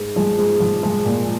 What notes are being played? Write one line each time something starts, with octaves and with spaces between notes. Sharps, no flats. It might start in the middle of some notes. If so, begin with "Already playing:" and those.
Already playing: G#2
F3 G#3
G#2
F3
F3 G#3
A#2